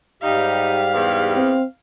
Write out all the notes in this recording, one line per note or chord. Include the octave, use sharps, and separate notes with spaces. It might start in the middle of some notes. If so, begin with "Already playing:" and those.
G#2 G3 D#4 G4 F5
E2
C4